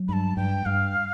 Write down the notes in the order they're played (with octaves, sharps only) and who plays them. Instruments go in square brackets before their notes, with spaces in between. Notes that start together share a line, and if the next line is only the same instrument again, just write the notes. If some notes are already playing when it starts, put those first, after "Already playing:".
Already playing: [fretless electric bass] F#3
[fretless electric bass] G2 [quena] A5 B5
[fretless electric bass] G2 [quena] G5
[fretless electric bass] G2 [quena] F5